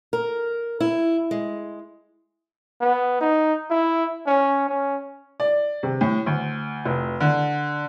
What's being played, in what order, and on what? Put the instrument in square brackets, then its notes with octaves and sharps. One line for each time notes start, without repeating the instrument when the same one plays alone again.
[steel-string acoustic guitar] A#4
E4
G#3
[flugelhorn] B3
D#4
E4
C#4
C#4
[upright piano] D5
C3
A2
D2
F1
D3